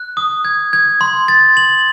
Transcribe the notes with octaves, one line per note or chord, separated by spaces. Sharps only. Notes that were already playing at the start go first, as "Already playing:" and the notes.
Already playing: F#6
D#6
G#6
G#6
C6
A6
F#7